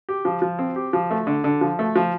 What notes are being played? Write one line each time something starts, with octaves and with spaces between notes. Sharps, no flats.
G4
F3
F3
C4
G4
F3
A3
D3
D3
F3
A3
F3